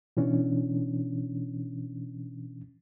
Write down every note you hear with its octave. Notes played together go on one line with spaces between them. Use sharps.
B2 E3 C#4 D4